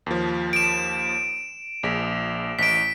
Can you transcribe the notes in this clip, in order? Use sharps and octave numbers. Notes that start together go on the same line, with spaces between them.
D#2 F3
D7 E7
A#1 G#4 B6
A1 B6 D7